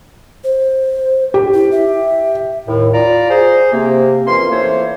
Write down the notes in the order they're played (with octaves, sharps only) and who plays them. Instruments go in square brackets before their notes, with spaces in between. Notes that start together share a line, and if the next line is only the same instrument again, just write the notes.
[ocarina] C5
[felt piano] G4
[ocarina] E4
E5
[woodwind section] D#2 A2
F4 D5 A#5
G#4 C5
C3 A#3
F2 E3 A#3 C#4 C6
E3 F3 A3 A#3 C5 C#5